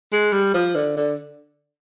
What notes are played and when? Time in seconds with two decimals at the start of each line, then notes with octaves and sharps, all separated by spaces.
0.13 G#3
0.33 G3
0.54 F3
0.75 D3
0.97 D3